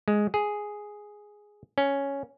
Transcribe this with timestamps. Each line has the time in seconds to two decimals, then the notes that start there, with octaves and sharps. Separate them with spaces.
0.08 G#3
0.34 G#4
1.78 C#4